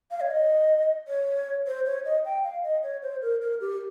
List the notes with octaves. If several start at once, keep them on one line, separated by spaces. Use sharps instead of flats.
F5
C#5
D#5
C#5
C5
C#5
D#5
G5
F5
D#5
C#5
C5
A#4
A#4
G4